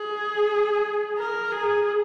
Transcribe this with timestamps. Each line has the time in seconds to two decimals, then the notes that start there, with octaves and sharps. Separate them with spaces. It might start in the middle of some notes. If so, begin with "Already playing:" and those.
Already playing: G#4
1.18 A#4
1.52 G#4